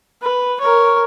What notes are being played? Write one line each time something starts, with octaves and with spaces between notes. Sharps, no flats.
B4
A#4 C#5